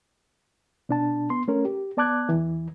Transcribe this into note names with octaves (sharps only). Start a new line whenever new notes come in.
B2 D4 A5
B3 C6
A3 C#4 A#4
G4
B3 D5 A5 D6 F#6 G#6
E2 E3